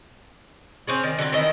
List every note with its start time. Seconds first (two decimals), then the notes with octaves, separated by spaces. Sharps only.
0.87 C4 C#4 G#4
1.03 D#3 D5
1.19 D3 F#3 A#3 C4
1.32 D#3 E3 E4 D#5